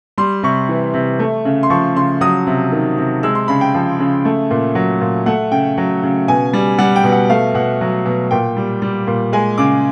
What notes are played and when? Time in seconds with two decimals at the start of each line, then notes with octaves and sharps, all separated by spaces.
0.18 G3 C6
0.43 C3 C#6
0.69 E3
0.94 C3
1.19 A3
1.45 C#3
1.63 C6
1.70 F3 C#6
1.96 C#3 C6
2.21 F#3 D#6
2.47 C3
2.72 D#3
2.98 C3
3.23 G#3 E6
3.35 C6
3.48 C#3 B5
3.61 G5
3.74 F3
4.00 C#3
4.25 A3
4.51 A#2
4.75 F#3
5.01 A#2
5.26 A3 F#5
5.52 C#3 G5
5.78 F#3
6.03 C#3
6.28 B2 G#5
6.53 G3
6.78 G3 F#5
6.96 G5
7.04 B2
7.12 F#5
7.30 A3 F5
7.54 B2 F#5
7.81 F#3
8.06 B2
8.31 A#2 G5
8.56 G3
8.82 G3
9.07 A#2
9.33 G#3 G#5
9.58 C#3 D6